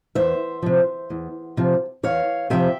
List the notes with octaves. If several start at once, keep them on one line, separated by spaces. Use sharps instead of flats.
E2 C5 E5
C3 F3
E2
C3 F3
E2 C#5 F5
C3 F3 E5 G5